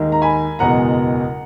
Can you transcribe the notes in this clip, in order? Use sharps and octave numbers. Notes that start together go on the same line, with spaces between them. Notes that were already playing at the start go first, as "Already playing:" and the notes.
Already playing: D#2 D#3 G#3 D#4
A#5
G#5 B5
F#1 E2 B2 G#3 F#5 A#5